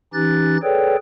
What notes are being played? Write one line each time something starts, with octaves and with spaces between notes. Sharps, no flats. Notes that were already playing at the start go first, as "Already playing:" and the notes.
E3 C#4 D#4 G4 F#6 A6
G#4 A4 B4 C#5 D5 G5